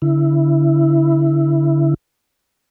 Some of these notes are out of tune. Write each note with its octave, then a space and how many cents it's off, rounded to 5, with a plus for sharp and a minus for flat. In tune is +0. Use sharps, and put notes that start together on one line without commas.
D3 -35 E4 +0